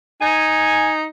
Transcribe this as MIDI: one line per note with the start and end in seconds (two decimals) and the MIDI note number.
0.21 1.06 63
0.21 0.90 80